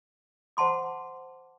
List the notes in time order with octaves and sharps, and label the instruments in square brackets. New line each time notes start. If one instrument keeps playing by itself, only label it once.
[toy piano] C5 F#5 A5 C6 D6